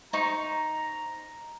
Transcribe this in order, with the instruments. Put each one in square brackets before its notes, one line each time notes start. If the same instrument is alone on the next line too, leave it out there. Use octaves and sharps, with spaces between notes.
[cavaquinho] D#4 C5 C#6 [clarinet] A#5